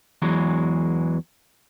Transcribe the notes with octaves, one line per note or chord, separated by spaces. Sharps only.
E2 E3 F#3 G#3